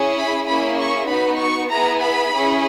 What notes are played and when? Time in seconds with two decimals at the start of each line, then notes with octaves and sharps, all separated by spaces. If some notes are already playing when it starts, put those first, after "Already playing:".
Already playing: C#4 E4 G#4
0.17 B5
0.47 A#3 C#4 E4 G#4 B5
0.79 C#6
1.08 B3 D#4 F#4 B5
1.39 C#6
1.70 B3 E4 G#4 A#5
2.01 B5
2.32 C#4 E4 G#4